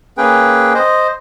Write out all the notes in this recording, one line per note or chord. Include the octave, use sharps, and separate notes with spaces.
A#3 C#4 G#4 B4 G5
C5 D#5